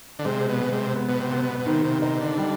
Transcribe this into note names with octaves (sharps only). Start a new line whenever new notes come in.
D3
C3 G#3
B2
G#3
C3
B3
B2
C3
B3
B2
B2
C3 D#3
C3
C3 D#4
D3
G3